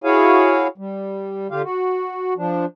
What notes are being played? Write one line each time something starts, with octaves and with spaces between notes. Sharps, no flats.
E4 F#4 G#4 C#5 F5 G#5
G3
D3 F4 G4 F5
F#4
F3 D4